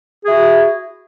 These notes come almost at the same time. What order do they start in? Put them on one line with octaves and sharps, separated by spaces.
G#4 E4 F#4